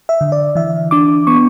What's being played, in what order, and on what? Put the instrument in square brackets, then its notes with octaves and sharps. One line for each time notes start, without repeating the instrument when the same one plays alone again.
[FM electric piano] E5
D3
D5
E3 E5
D4 D6
B3 C#6